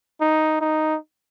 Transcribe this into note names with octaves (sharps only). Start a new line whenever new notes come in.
D#4
D#4